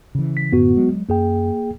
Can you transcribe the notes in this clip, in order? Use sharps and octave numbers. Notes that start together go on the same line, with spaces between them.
C#3 E3
B6
F#2 A2 D3 B3 F#4
F#3 G#3
F#2 A#3 G#4 G5